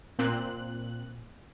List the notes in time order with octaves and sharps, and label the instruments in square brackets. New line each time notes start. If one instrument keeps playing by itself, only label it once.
[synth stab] A#2 C4 F#6